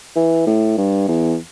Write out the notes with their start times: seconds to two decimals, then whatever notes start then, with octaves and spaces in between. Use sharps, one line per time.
0.15 E3
0.46 A2
0.77 G2
1.08 E2